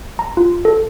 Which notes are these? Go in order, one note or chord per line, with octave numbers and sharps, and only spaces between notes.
A#5
F4
A4